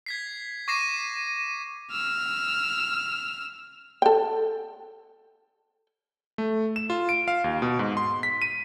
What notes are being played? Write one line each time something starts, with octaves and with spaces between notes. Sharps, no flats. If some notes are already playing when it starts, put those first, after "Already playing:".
G#6 B6 C7
C#6 D6 A#6 C7 D#7 E7
E6 F6
A4 G5
A3
E7
F4
D7
F5
D#2
B2
G#2
C6
B6
D#7